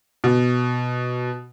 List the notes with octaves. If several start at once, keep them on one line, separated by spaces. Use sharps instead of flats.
B2